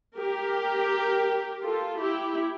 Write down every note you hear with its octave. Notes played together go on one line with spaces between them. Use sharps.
G4 A#4
F4 A4
E4 G4